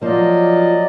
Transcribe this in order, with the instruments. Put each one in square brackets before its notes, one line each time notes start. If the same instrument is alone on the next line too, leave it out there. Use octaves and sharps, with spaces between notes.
[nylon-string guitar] F3 A#3 [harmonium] F#3 D5 D#5